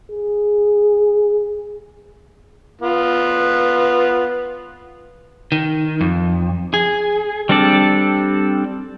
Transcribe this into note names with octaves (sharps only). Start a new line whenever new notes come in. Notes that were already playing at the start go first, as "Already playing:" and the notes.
G#4
B3 F4
D#3
F2
G#4
G3 C4 D4 A4 D5